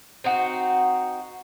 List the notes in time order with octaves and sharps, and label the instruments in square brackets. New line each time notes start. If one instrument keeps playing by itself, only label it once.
[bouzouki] C4 D#4 F#4